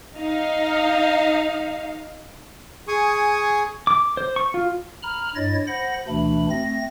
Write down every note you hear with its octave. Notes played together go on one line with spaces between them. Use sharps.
D#4 F5
G#4 G#5 C#6 D#6
D6
C5
C#6
F4
A#5 B5 F6
G2 E4 C#5 D#5 A6
C5 F#5 B5 A#6
D2 B2 E3 A3 D4 B5
A3 C4 A#6